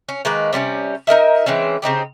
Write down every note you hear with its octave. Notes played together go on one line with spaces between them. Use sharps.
C#4
D#3 G#3 A#3 B4
C3 G3 B3 C#4
D#4 A#4 D#5 E5
E3 G#3 C4 C#4
C#3 C4 D#4 G4